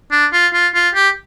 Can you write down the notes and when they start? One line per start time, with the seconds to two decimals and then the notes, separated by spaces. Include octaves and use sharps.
0.12 D4
0.33 F4
0.54 F4
0.75 F4
0.95 G4